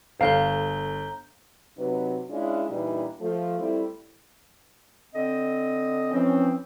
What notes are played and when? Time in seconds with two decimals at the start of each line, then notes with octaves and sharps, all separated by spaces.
0.21 G1 F5 A#5 G6 G7
1.78 C3 F#3 D#4 B4
2.30 G#3 C#4 D4 E4 F4
2.69 A#2 E3 G3 D4 D#4
3.21 F3 A3
3.59 G3 A3 C4 E4
5.14 D3 C4 D#5
6.11 E3 F3 C4 C#4